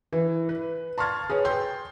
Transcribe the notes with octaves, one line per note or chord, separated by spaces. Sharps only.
E3
B4
A5 C6 C#6 F6 G#6 A6
G#4 B4 C#5
G5 C6 G6